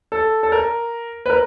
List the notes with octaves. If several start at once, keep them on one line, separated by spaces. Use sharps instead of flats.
A4
A4
A#4
B4
A#4